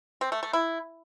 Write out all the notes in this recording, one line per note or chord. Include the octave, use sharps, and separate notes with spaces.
C4
A3
A3
E4